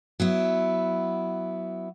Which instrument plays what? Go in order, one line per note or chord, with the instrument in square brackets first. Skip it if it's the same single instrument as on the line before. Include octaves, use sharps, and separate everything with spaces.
[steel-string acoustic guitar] F#3 B3 E4